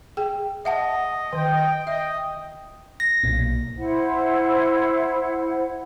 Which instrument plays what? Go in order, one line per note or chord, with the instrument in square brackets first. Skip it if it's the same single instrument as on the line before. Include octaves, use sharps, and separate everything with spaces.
[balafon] G#4 G5
[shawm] D#5 [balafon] E5 F#5 A5
[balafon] D#3 [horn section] G5
[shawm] D#5 [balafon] E5
[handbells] A#6
[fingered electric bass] B1 A#2
[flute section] E4 C5 F#5